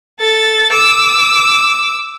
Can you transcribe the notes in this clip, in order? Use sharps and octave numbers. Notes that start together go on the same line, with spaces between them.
A4 A6
D6 E6